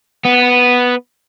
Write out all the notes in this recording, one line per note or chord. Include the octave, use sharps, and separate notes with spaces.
B3